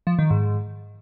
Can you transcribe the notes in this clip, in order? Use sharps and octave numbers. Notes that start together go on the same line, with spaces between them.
F3
D#3
G#2